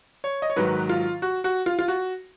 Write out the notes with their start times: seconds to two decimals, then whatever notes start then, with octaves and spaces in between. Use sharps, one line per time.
0.24 C#5
0.42 D#5
0.50 C#5
0.56 G#2 D#3 F#3 B4
0.89 F4
1.22 F#4
1.44 F#4
1.66 F4
1.79 F4
1.88 F#4